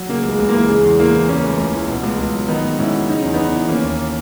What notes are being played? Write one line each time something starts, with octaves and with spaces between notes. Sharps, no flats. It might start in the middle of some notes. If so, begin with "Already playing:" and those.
Already playing: F#3
C#3 A#3
C#2
G#3
C#2
A#3
E3
C#3 G#3
E2
E2 A#3
E3
C#3 A#3 C#4
C#2
C#2
E3
B2
C#2
C#2
F#3
D#3 B3 D#4
G#2
G#2 C#4 E4
F#3
C#3 D#4
E2 C#4
B3 D#4
E2
E3
D#3 A#3 C#4
D#2